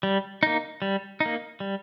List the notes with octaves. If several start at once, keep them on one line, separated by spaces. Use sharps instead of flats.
G3
A#3 D#4
G3
D#4
A#3
G3